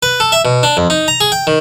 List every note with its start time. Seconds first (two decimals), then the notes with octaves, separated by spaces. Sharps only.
0.03 B4
0.20 A4
0.32 E5
0.45 B2
0.63 D4
0.77 F2
0.90 D#4
1.08 A#5
1.21 G#4
1.32 G5
1.47 D#3